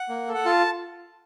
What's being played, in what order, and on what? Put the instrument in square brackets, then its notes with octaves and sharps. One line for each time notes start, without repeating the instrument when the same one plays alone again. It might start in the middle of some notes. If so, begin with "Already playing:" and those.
Already playing: [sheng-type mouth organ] F#5
A#3
A4
F#5
F4 A5